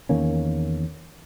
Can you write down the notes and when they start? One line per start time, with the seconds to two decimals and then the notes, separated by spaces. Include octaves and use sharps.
0.09 E2 D#3 A#3 C#4